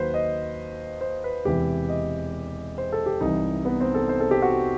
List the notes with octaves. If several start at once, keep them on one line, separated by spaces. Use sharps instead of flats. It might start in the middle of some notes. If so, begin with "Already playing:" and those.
Already playing: D#2 D#3 F#3 B4 C5
D#5
C5
B4
E1 E2 C3 E3 G4
D#5
C5
A4
G4
C2 C3 E3 G3 D#4
B3
C4
A4
C5
A4
G4
F#4